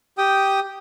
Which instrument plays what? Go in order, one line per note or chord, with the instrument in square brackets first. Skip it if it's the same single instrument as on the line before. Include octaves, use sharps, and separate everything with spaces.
[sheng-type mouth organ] G4 G5 D#6